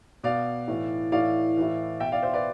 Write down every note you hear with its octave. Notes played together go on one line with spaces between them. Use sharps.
B2 D5 F5
A2 E3
A2 E3 D5 F5
A2 E3
B2 E5 G5
D5 F5
C5 E5
B4 D5